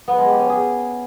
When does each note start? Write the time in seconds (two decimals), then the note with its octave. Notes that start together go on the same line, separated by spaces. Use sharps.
0.08 B3
0.18 G#3
0.29 G4
0.39 C#4
0.50 G#4